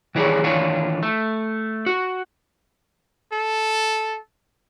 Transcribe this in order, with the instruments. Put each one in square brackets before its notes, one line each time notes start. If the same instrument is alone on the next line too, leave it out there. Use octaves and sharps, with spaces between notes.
[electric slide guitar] D#3 E3 G3 G#4 C#5
D#3 E3 D4 F4 C#5
A3
F#4
[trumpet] A4